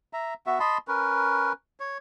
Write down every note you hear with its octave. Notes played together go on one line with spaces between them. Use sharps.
E5 A#5
B3 F#4 E5
D#5 A5 B5 C6
C#4 A#4 B4
C#5